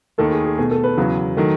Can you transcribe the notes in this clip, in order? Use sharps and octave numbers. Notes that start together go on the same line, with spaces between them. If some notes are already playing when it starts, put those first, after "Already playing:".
D#2 D#3 A3 A4
G#4
G#4
B2 A3 G#4
A4
B4
E2 C#3 F#3 B3
D#3 F#3 A3